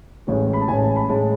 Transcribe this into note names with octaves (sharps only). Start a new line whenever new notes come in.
A1 A2 G#3
B5
A5
A1 A2 G#3 G#5
A5
B5
A2 G#3 A5